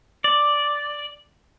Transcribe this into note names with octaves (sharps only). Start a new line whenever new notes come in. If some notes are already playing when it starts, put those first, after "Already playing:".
D5